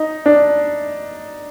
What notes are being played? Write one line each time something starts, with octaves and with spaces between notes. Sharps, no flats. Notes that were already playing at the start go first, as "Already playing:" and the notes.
Already playing: D#4
D4